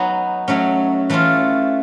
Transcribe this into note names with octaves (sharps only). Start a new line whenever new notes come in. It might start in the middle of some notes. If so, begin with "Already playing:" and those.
Already playing: F#3 B3 D#4 F#4
F#3 A3 C#4
E3 A3 C#4 F4